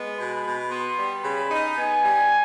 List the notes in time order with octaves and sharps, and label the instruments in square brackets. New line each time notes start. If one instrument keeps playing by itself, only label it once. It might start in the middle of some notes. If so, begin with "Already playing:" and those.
Already playing: [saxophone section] G#3 B3
[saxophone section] B2 [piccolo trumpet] B5
[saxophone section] B2
[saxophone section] B3 [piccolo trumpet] C6
[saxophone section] G3
[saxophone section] C#3 [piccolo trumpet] B5
[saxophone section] D#4
[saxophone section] B3 [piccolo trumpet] G#5
[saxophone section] G3